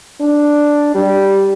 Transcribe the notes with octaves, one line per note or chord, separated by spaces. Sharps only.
D4
G3